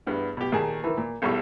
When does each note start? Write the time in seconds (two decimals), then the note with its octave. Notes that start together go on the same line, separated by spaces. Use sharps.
0.07 E2 G2 B3
0.37 B2 G4
0.52 D#2 A#2 G#4 A5
0.84 D#3 E3
0.98 A#2
1.22 B1 E2 G3 A4 C#6